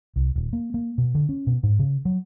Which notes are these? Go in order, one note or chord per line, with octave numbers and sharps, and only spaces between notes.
C2
D#1
A#3
A#3
B2
D3
C#4
B2
G#2
C#3
F#3